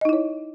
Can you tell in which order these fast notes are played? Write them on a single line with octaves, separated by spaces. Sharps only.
D#5 D#4 E4 C#5